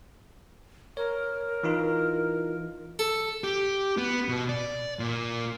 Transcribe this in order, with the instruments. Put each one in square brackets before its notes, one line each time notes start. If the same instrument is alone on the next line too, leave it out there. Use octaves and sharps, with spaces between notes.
[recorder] A#4 [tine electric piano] C#5
[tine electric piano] E3 D#4 F4
[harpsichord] A4
[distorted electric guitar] G4
B3
B2
D5
A#2